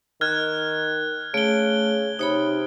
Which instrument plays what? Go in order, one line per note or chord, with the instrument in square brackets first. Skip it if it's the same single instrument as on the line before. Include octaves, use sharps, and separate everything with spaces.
[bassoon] D#3 [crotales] F6 F#6 G#6
[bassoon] C#3 [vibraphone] A3 [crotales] D7 G7
[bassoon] C3 [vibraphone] D#4 C#5 B5